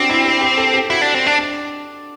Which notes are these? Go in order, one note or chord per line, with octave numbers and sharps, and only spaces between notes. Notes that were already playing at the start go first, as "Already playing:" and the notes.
Already playing: C4 D4 F#4 G4
E4
G4
G4
A4
G4
E4 F#4
D4
C4
D4
D4